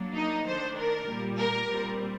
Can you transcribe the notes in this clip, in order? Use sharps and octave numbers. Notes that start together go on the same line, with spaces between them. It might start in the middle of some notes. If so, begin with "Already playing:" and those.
Already playing: F#3 A#3 D4
D#4 D#5
D#3 A3 D4 C5
A#4
A#2 G3 A#3
A#4
A#2 G3 C4